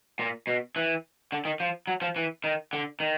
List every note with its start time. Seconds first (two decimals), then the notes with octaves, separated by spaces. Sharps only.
0.19 A#2
0.47 B2
0.76 E3
1.32 D3
1.45 D#3
1.60 F3
1.87 F#3
2.02 F3
2.16 E3
2.44 D#3
2.73 D3
3.00 D#3